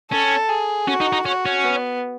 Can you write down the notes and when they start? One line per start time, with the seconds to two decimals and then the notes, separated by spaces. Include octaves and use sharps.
0.11 C#4 A4
0.49 G#4
0.87 C#4 F#4
1.00 D#4
1.13 D#4
1.25 C#4 F#4
1.46 C#4
1.65 B3